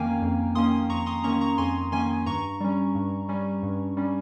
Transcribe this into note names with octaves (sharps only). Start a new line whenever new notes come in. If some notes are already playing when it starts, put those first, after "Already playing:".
Already playing: F2 D#3 A#3 C#4 F5 G5 G#5 A#5
F2
D#3 A#3 C#4 C6 D#6
F2 A#5 C#6
C6 D#6
D#3 A#3 C#4 A#5 C#6
A#5 C#6
F2 G#5 C6
D#3 A#3 C#4 G#5 C6
G2 A#5 C#6
G3 C#4
G2
G3 C#4
G2
G3 C#4